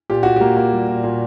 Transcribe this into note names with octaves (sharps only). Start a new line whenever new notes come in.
A#2 G4
A#2 F#4
A#3 G4
A#3
G3
A#2
A#2